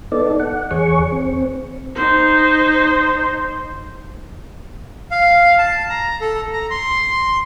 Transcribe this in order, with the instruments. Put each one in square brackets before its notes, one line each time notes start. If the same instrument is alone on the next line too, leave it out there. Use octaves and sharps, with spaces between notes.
[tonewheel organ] B3 D#4 A4 D5
F#5
E2 G#4 C#5 C#6
C4
[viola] D#4 C5
[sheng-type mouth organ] F5
A5
A#5
A4
A#5
C6